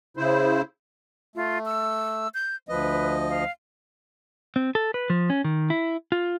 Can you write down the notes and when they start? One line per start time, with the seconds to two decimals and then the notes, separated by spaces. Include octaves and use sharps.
0.17 C#3 E4 C5
1.36 A3 F4
1.66 E6
2.34 G6
2.69 D2 F3 B4 D#5
3.29 F5
4.56 C4
4.75 A4
4.94 B4
5.10 F3
5.30 C#4
5.44 D#3
5.70 E4
6.12 F4